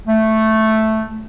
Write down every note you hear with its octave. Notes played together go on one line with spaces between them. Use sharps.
A3